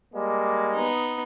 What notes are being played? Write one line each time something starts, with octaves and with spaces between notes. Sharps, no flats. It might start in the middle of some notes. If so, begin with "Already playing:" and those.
G3 G#3 A#3
B3 D#4